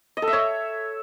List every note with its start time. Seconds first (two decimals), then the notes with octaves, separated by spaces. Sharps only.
0.17 D#5
0.22 A4
0.27 E5
0.33 C#5